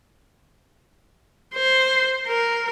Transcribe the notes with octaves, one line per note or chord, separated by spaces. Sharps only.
C5
A#4